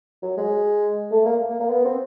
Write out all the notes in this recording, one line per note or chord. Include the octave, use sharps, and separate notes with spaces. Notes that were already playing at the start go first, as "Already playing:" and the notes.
F#3
G#3
A3
A#3
A#3
A#3
B3
C4